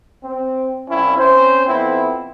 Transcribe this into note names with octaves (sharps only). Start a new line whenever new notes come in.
C4
C2 C4 C#4 E4
C4 C#4 C5
F2 B3 C4 E4